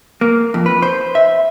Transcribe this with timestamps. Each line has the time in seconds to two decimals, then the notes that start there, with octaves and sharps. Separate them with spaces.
0.21 A#3
0.54 F2
0.66 B4
0.82 C5
1.15 E5